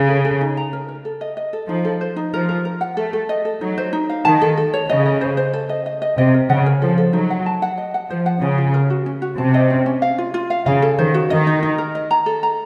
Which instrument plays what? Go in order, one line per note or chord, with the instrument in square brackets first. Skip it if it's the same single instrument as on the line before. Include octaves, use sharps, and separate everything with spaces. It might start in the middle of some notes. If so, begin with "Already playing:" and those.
Already playing: [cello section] C#3
[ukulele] A4
A4
D#4
A#5
A#4
A#4
A4
D#5
D#5
A4
[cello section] F3 [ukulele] D#4
[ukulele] A4
C5
D#4
[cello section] F3 [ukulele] A#4
[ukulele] A#4
A#4
F#5
[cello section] A3 [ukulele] A4
[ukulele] A4
D#5
A4
[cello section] F#3 [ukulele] D#4
[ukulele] C5
D#4
F5
[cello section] D#3 [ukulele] A5
[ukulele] A4
A4
C#5
[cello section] C#3 [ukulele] D#5
[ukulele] D#5
C5
C5
A4
D#5
D#5
D#5
[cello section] C3 [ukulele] D#5
[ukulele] A#4
[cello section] C#3 [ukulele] F#5
[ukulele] A#4
[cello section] F3 [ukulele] A4
[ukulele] A4
[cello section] F#3 [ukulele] D#4
[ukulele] F#5
A5
F#5
D#5
F#5
[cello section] F3 [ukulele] C5
[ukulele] F#5
[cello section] C#3 [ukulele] F4
[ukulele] F4
A#4
F#4
C#4
F#4
[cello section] C3 [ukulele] A5
[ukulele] D#5
C#4
C#4
F5
F4
F4
F5
[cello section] C#3 [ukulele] F5
[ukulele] A4
[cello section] D#3 [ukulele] C5
[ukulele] F#4
[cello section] D#3 [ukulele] D#5
[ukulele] D#4
D#4
A#4
D#5
A#5
A4
A#5